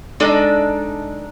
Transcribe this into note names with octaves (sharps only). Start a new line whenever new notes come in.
G#3 D4 D#4 A4 D5